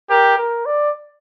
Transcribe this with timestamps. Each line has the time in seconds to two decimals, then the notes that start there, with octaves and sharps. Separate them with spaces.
0.10 G4 A#4
0.38 A#4
0.66 D5